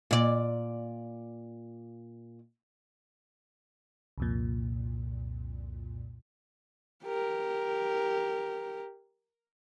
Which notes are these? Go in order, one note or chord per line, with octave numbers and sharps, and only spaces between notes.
A#2 D5
C2 F2 A#2
G4 A#4